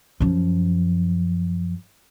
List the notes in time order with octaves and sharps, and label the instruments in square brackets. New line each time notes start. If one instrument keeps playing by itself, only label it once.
[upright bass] F#2 F3